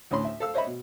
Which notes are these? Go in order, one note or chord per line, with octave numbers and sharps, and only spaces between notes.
D2 A2 C#4 B5 C6
E5
A4 F5 E6
C5 C#5 D#5 E5 B5
B2